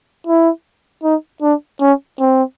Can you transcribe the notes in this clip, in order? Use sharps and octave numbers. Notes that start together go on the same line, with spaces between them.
E4
D#4
D4
C#4
C4